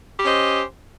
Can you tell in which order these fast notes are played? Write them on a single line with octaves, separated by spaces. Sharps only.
G4 C#4 C5 D#5